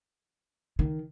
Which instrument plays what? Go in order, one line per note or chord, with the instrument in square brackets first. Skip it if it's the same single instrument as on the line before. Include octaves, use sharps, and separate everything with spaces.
[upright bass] D#3